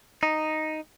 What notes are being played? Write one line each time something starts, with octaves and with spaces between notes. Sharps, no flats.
D#4